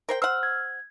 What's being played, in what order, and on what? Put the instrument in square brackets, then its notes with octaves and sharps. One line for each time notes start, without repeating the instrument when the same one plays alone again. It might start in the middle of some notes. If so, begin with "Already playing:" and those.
[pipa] A#4 C5 G5
[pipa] C5 F#5 [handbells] E6 F6
[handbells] G#6